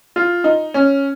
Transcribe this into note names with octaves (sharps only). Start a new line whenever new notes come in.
F4
D#4
C#4